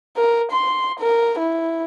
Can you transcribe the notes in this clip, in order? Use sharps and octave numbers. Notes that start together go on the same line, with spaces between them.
A#4
C6
A#4
E4